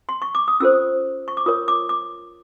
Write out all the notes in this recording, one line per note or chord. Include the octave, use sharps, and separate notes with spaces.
C6
C#6
D6
D#6
C#4 F4 A4 C5 E6
C#6
D6
F4 A#4 C#5 D#6
D6
D6